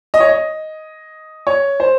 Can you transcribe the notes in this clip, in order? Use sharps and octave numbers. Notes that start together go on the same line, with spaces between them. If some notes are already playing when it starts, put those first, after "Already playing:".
D#5
C#5
D#5
C#5
C5